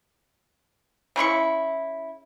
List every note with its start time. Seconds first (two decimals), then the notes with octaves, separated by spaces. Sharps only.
1.16 C#3 E4 C6 C#6